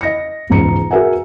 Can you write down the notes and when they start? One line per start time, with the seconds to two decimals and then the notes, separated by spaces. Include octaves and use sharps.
0.01 D#5 A#6 C#7
0.50 E1 C#2 G#2 A#5 C#7
0.91 F#4 G#4 A#4 E5 F#5 G#5